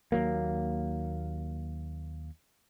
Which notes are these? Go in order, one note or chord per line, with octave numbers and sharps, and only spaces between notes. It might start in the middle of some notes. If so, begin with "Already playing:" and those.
D#2 F#3 A#3